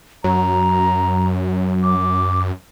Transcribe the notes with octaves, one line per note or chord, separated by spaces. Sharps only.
F#2 F#3 A#5
D6